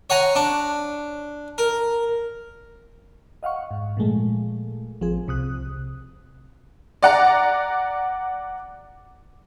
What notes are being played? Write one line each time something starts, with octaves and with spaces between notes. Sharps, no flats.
C#5 F#5 G#5 A#5
D4
A#4
D#5 F5 F#5 C#6
G#2
A#2 F3 G#3 A3
A1 F3 C4 G#4
C2 C3 D#6 F#6
D5 F#5 A#5